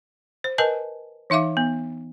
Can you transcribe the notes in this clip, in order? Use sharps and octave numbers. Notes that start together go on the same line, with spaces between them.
C5
A#4 B4 D#5 G#5 A5
E3 D#4 E5 F5 D6
B3